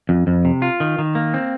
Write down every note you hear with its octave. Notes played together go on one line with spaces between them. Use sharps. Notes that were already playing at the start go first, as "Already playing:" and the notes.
F2
F2
C3
F4
D#3
D#3
A#3
C4